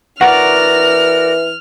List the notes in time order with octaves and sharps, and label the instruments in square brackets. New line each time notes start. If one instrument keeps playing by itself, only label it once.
[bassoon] E3 [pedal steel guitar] F#4 A#4 D5 [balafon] F#5 [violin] F6